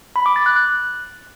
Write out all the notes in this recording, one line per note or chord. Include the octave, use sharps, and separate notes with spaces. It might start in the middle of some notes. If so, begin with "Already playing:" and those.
B5
D6
A6
F#6
F#6